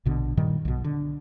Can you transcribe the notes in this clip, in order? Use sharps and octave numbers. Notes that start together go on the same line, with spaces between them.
A#1 B2 D3
G2 A#2 D#3 G3
B1 B2
D3